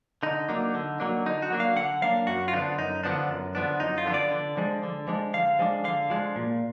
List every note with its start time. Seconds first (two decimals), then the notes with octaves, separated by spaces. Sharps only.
0.23 D3 D#4
0.49 F#3 A#3 D4
0.75 D3
1.00 F#3 A#3 D4
1.26 D3 D#4
1.42 F#4
1.50 F#3 A#3 D4
1.60 F5
1.76 D3 F#5
2.02 F#3 A#3 D4 F5
2.27 F#2 F#4
2.48 F4
2.53 D3 F3 B3 D4 D#4
2.78 F#2 D#4
3.03 D3 F3 B3 D4
3.29 F#2
3.55 D3 F3 B3 D4
3.80 F#2 D#4
3.98 F4
4.05 D3 F3 B3 D4
4.14 D5
4.31 D3
4.57 F3 G#3 D4
4.83 D3
5.08 F3 G#3 D4
5.34 D3 F5
5.59 F3 G#3 D4
5.84 D3 F5
6.10 F3 G#3 D4
6.36 A#2